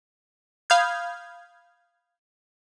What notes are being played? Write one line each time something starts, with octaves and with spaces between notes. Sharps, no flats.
F5 B5 D#6 F6 G6 G#6